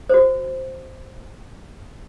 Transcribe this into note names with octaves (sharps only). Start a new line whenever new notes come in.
F#4 C5